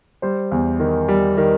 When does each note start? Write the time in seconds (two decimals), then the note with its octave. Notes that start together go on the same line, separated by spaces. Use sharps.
0.22 G3 C5
0.52 E2
0.80 D#3
1.08 G3
1.37 D#3